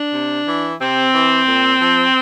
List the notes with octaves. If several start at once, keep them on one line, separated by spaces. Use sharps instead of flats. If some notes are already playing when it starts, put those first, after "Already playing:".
Already playing: D4
C3
E3
C3 C4
E3
A#2
F3